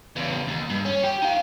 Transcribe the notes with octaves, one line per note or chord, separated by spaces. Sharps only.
E2 C#3
D#2
G2
C#4
G4
D#4 F5